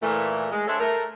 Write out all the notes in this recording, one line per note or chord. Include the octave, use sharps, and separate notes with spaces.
A#2 E3 A3
G#3
D4 G#4 A4 C5 C#5 E5
A3 A#4